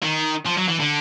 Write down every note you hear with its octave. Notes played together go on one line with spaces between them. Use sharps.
D#3
F3
F#3
E3
D3